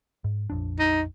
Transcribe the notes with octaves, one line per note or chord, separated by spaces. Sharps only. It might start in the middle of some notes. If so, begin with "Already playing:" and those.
G#2
A#1 F2 D4
D#4